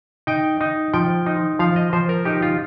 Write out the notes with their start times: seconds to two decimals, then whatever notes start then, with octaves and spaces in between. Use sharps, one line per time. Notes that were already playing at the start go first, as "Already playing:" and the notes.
0.27 D#4 G5
0.61 D#4
0.94 F3 G5
1.26 D#4
1.59 F3 F5
1.76 D#5
1.93 F3 C5
2.09 A#4
2.25 D#4 G4
2.42 F4